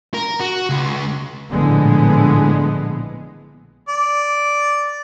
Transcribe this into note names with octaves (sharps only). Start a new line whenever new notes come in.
A#4
F#4
C#2
A#1 A2 D3 E3 G#3 B3
D5